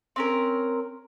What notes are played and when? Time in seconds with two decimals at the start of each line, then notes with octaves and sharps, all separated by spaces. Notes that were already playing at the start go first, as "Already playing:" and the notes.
0.16 C4 C#4 A#4